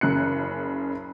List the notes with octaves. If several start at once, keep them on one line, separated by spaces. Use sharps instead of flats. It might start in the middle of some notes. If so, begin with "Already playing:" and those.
F#1 C#3 F#6 C#7